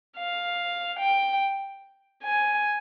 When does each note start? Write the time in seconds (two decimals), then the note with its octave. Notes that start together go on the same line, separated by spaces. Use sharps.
0.18 F5
0.99 G5
2.24 G#5